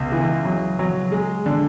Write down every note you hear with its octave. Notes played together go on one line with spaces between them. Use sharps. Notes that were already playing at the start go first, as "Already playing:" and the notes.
Already playing: C#2 B2
E3
F#3
F#3
G#3
D3